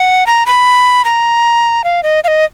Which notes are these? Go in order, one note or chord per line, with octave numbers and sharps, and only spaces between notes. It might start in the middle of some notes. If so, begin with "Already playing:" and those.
Already playing: F#5
A#5
B5
A#5
F5
D#5
F5
D#5